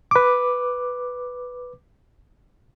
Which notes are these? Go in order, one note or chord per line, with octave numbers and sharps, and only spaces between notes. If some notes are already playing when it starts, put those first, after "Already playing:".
B4 D6